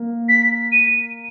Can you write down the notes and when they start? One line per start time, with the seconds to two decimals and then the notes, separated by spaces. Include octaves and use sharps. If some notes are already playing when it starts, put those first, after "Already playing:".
Already playing: A#3
0.29 B6
0.72 D#7